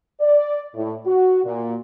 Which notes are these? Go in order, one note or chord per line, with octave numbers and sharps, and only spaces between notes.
D5
A2
F#4
A#2